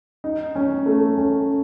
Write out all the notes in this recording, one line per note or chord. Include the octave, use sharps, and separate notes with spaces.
D#4
C#4
A3
C#4